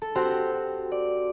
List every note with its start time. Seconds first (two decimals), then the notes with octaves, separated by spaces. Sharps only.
0.02 A4
0.15 C4 F#4 G4 C5
0.92 D5